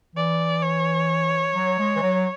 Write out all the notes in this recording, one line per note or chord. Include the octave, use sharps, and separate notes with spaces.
E3 D5
C#5
F#3
G#3
E3
F#3